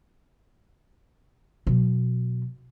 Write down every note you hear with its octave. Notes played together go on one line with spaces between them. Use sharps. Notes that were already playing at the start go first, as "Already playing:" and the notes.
B2 F#3